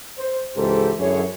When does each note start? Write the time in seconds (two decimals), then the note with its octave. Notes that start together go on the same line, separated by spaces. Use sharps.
0.18 C5
0.56 C#2 G#2 E3 G4 A4 C5
0.98 F#2 D3 E4 G#4 C#5